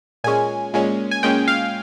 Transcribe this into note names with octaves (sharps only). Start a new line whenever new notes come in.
A#2 G#3 C#4 G#5
A#2 G#3 C#4
G#5
A#2 G#3 C#4 G5
F5